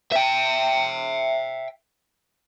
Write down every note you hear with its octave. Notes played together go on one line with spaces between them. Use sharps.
E5 G5